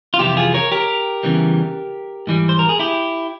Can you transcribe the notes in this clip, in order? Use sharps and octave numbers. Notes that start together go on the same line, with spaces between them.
F4
F2 C3 E3 G3 E4 G4
F4 G#4
A#4 C#5
G4 A#4
E2 C#3 E3 G3
G#2 E3 G3
C5
A#4
G#4
E4 G4